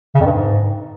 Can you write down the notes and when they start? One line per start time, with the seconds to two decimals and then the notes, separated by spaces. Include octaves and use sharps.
0.15 C#3
0.20 F2
0.26 G2
0.31 G#2